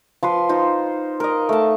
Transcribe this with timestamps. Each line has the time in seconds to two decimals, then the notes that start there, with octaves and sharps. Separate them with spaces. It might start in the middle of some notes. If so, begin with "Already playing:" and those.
0.23 F3 B4 C6
0.49 D#4 F4 C5
1.20 A#4 D#5
1.49 A3 A5